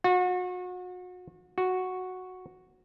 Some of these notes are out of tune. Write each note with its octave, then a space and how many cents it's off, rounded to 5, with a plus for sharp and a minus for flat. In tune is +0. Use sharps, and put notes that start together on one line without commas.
F#4 -35
F#4 -5